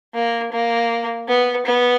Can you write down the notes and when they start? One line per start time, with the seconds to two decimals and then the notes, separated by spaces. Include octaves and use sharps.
0.14 A#3
0.52 A#3
1.28 B3
1.66 B3